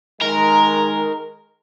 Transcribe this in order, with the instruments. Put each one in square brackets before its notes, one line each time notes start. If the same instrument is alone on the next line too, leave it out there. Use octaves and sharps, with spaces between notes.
[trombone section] D#3 G#3 [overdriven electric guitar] A#4